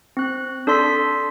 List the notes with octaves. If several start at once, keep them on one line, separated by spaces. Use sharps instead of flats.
C4 F#6
D4 A4 D5 C6 B6